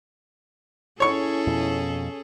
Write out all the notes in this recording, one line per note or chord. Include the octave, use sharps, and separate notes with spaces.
C#4 E4 G#4 A4 C#5 C#6
F2 B2